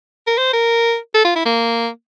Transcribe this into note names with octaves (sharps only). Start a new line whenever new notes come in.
A#4
C5
A#4
A4
F4
E4
A#3